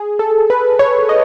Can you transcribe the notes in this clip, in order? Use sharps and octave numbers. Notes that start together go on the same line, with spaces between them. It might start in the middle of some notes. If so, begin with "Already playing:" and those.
Already playing: G#4
A4
B4
C#5
D#5